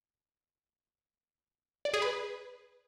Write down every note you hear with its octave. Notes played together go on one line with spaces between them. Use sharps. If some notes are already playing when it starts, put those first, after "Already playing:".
D5
G#4
B4